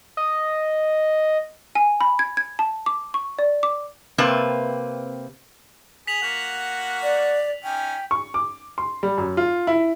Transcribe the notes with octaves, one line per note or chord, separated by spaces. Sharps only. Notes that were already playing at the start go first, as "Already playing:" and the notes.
D#5
G#5
B5
G#6
G#6
A5
D6
C#6
D5
D6
C3 A#3 C4 B4 A5
G#4 B6 F7 F#7
A#3 F#4 F#5
D5
C#4 D#4 G5
C#6
D6
C6
G3
F#2
F4
E4